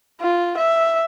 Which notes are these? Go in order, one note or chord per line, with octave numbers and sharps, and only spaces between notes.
F4
E5